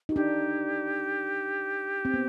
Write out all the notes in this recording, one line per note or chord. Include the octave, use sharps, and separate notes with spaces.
D#4 F#4
D4 G4
C4
B3